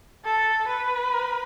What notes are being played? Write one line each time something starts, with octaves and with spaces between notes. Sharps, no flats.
A4
B4